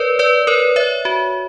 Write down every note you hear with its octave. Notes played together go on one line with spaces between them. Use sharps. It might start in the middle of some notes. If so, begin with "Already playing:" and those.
Already playing: A#4 B4 C#5 D5
B4 D5
A#4 C#5
C#5 E5
F#4